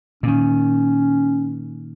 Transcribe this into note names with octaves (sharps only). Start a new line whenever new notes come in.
A#2 D#3 C#4